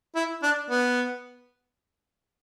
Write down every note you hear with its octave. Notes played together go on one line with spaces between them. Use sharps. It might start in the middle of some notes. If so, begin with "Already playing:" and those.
E4
D4
B3